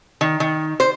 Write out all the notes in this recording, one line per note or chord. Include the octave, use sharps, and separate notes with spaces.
D#3
D#3
C5